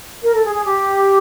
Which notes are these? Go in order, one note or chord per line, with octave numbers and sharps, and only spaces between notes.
A#4
A4
G#4
G#4
G4